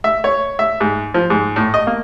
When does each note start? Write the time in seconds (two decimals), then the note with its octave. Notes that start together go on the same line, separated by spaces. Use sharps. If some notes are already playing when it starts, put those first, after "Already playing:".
0.04 E5
0.24 C#5
0.59 E5
0.80 G#2
1.14 F3
1.30 G#2
1.56 A2
1.74 D#5
1.87 A#3